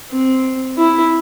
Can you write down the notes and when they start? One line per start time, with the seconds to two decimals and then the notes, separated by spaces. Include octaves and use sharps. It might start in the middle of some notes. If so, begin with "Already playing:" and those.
0.11 C4
0.77 E4